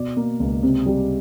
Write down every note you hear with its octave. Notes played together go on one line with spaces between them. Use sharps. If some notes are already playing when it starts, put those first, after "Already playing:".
Already playing: B2 D5
A#3
C#2
C3
G3